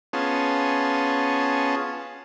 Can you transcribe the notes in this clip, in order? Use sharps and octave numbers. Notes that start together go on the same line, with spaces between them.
B3 C#4 F4 G#4 A5